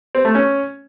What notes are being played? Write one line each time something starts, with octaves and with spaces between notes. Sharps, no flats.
C4
A3
C#4